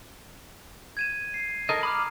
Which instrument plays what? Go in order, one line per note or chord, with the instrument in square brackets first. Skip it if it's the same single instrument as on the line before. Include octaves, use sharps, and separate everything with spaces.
[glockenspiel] G#6 D#7 E7
C7
[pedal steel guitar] A4 A#4 D#5
[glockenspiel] A#5 D#6 [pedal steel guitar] B5 D6 F6